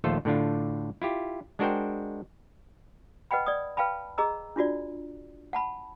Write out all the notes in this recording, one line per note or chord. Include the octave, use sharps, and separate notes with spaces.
A#1 D#2 A3 F4 A4 C5
A2 D3 D4 F4
E4 F4 G4
G#3 D4 F#4 A#4 C5 G5
B4 D#5 F#5 G5 B5
D5 D#6
B4 F5 G5 A5 B5
G#4 D#5 A#5 E6
D4 F4 F#4 D5
F#5 A5 B5